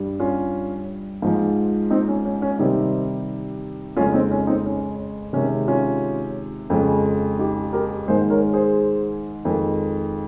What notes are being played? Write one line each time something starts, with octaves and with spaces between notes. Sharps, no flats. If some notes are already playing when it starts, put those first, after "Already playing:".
Already playing: G2 G3
C#4 F4
G#2 F3 G#3
C4 D#4
C#4
C#4
C#4
C3 D#3 G3 C4 D#4
F2 C#3 G#3 C#4 F4
C4 D#4
C#4
C4 D#4
C#4
C3 D#3 G#3 C#4
C#4 F4
F2 C#3 G#3
D#4 G4
G4 A#4
G#2 D#3 G#3 G#4 C5
A#4 C#5
G#4 C5
F2 D#3 G#3